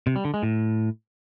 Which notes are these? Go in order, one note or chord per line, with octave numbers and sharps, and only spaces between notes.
C3
G3
D3
G#3
A2